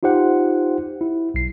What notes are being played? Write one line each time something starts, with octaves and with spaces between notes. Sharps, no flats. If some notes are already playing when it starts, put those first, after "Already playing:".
D#4 F4 G4 C5 F#5
E4
B1 C7